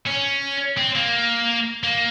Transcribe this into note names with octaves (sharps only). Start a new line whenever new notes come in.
C#4
C4
A#3
A#3